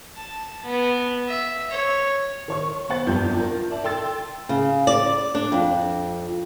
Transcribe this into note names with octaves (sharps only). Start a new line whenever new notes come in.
A5
B3
E5
C#5
D#3 C#5 C#6
B3 C5 F#5 A6
G1 F2 B3 G4 D5 G6
F4 A#4
D5 E5 A5
A4 G5 C6 E6 A6
C#3
D5
D4
F2